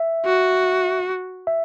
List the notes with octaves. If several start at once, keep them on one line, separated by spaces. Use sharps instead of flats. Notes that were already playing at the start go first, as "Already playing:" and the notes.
Already playing: E5
F#4
E5